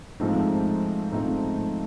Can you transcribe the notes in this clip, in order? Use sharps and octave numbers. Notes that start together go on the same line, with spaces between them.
G#2 F3 A3 C4 D#4
G#2 F3 A3 C4 D#4